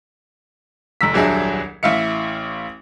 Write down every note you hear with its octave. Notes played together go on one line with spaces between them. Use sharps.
F1 A#5 E6 B6
D#1 C2 F#3 D4 G#4 E5
A1 E4 E5 F5 C#7